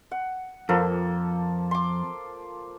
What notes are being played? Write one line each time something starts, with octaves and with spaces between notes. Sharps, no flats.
F#5
F2 F3 A#3 A4
C6 D6